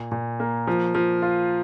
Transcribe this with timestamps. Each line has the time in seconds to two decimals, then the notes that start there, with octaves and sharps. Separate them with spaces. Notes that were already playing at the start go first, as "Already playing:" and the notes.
Already playing: A#2
0.12 A#2
0.40 A#3
0.67 F3
0.95 F3
1.22 F4